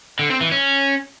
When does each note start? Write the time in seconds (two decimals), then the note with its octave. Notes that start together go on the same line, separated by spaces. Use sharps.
0.19 D3
0.30 C4
0.41 E3
0.52 C#4